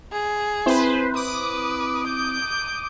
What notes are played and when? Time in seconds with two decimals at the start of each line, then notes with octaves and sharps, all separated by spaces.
0.13 G#4
0.66 C4 E4 B4 C5
1.15 B4 D6 D#6
2.07 G6